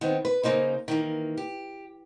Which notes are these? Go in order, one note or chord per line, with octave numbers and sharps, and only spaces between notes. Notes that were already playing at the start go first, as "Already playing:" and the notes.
D#3 B3 C4
B4
C#3 A#3 D#4 C5
D#3 E3 A#3
G4